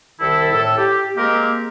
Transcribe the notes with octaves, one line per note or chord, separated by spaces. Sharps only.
C2 D#3 E4 A4
A2 A4
G4
G#3 A#3 C4 G4 A#4